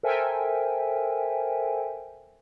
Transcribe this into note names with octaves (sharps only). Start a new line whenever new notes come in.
A4 A#4 C5 E5 G5 G#5